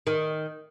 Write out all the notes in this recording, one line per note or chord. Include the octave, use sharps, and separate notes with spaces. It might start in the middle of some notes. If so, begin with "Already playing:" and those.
D#3